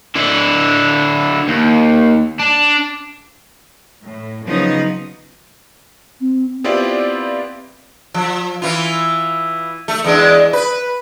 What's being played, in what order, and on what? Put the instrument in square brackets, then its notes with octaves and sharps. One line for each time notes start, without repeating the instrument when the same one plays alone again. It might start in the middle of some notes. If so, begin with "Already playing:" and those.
[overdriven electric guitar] D3 E4
D#2
D4
[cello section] A2
C#3 F3 F#3 B3 D#4
[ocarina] C4
[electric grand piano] B3 C4 E4 F4 G4 D5
[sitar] F3
E3 F4
A3
E2 G#3 D4
B4